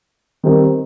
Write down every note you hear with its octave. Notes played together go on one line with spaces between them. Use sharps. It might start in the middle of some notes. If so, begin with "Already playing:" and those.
D#3 G3 C4 D#4